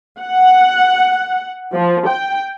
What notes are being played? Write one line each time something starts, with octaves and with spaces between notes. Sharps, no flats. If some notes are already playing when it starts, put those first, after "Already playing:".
F#5
F3
G5